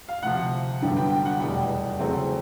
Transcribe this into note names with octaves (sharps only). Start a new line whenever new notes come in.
F5
D2 C3 F3 F#5
G2 D3 F#3 B3 G5
G5
G5
F#5
F1 E2 B2 G3 G5
E2 C#3 F#3 A3 C4